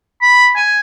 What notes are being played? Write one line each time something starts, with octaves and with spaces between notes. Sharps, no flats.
B5
G#5